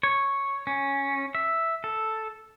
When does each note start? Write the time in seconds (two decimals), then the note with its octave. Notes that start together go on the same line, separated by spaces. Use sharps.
0.03 C#5
0.67 C#4
1.35 E5
1.84 A4